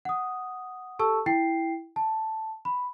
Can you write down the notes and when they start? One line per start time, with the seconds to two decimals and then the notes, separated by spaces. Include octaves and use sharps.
0.05 F#5 D#6
0.99 G4 A4 A5 C#6 E6
1.26 E4 G5 C7
1.96 A5
2.65 B5